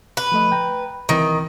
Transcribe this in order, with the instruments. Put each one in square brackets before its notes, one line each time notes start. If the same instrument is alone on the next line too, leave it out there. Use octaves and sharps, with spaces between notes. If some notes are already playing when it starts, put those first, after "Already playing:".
[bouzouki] B4
[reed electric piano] F3 A3 D#5
G5 A#5
[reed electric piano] C2 E3 C4 [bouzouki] D#3